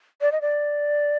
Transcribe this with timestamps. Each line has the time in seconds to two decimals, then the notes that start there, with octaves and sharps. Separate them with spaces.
0.21 D5
0.32 D#5
0.41 D5